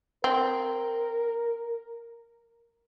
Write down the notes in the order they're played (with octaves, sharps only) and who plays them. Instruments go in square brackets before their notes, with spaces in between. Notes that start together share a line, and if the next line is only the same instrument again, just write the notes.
[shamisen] C4 [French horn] A#4